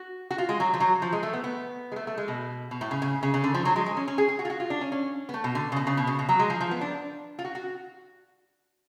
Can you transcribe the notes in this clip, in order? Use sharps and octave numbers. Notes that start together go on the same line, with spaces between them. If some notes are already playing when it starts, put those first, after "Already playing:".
Already playing: F#4
F#4
F4
G#3
F#3
F3
F#3
F3
G#3
A3
B3
B3
G#3
A3
A3
G#3
B2
B2
A2
C#3
C#3
C#3
C#3
D3
F3
F#3
G#3
G#3
C#4
C#4
G#4
G#4
F#4
F4
F#4
F4
D4
C#4
C#4
B3
A3
B2
D3
C#3
B2
C#3
B2
C#3
B2
F#3
G#3
F3
F3
B3
D4
F4
F#4
F#4